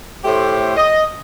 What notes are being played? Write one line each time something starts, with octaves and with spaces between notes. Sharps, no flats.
A2 A3 G4 C5
D#5